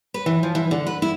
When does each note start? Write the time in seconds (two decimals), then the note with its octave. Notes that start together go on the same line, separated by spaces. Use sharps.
0.14 B4
0.26 E3
0.43 F3
0.55 E3
0.71 D3
0.87 B4
1.02 E4